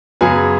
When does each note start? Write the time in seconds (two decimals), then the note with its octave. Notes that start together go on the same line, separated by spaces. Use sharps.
0.21 F#2 C#3 F#3 B3 G#4 G#5